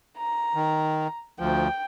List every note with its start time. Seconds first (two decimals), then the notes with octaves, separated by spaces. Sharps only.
0.18 A#5
0.55 D#3
1.40 D2 F3 G5